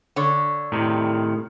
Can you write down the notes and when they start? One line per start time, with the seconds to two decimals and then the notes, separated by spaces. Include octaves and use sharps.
0.16 D3 C#5
0.72 A2 C3 D#3